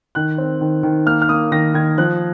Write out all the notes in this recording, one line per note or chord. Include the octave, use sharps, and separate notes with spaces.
D#3 F#6
C4
D#3
D#3
A#3 F6
F6
A#3 D#6
D#3 A#6
D#3 G#6
F3 F#6